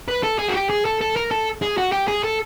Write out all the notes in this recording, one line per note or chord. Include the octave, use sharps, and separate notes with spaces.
B4
A4
G#4
F#4
G4
G#4
A4
A4
A#4
A4
G#4
F#4
G4
G#4
A4